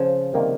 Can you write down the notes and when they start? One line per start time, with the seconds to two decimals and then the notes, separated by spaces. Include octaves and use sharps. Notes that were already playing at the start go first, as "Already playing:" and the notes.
Already playing: C#3 F3
0.33 C3 D#3 G3 A#3